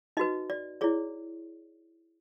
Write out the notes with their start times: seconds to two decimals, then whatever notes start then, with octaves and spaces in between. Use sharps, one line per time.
0.17 D#4 F#4 B4 D#5
0.50 D5
0.81 E4 G#4 C#5 D5